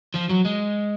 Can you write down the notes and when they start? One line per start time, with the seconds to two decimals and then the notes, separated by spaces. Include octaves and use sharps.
0.15 F3
0.30 F#3
0.46 G#3